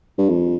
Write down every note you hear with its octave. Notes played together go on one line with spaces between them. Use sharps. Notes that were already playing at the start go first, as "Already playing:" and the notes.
G2
F2